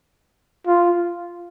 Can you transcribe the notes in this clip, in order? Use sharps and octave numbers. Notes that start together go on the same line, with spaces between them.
F4